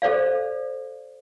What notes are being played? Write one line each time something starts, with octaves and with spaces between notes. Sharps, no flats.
A4 C5 D5 F5